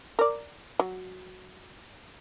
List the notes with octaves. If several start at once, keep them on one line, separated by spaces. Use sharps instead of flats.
A#4 D5
F#3